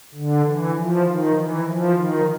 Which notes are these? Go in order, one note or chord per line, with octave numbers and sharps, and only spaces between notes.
D3
E3
F3
D#3
E3
F3
D#3